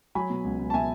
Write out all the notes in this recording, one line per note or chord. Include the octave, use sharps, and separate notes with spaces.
F#3 G#5 B5
B2
C#2
C#2
A5
B2 E5 G#5